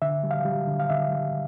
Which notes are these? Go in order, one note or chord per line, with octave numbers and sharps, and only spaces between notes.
D3 E5
G3
F5
G3
D3
F5
D3 E5
G3